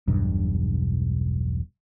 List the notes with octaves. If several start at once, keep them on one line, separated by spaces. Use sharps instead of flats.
E1 B1 G2